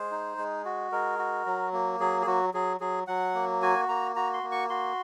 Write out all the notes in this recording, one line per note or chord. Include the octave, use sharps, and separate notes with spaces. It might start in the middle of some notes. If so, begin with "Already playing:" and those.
Already playing: G#3 C5
D#4
G#3
F#4
G#3 A#4
F#4
F#3
A#3
F#3 G#4
G#4
F#3 F#4
F#3 G#4
F#3 G#4
F#3 F#5
A#3
F#4 G#5
A#3 A#5
F#4 A#5
C6
A#3
C#6
F#4 C6